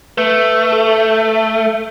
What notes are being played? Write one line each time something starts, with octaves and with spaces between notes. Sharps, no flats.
A3 B4
A4